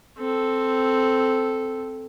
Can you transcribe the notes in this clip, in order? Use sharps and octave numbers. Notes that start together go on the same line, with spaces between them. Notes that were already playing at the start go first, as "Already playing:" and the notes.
C4 A4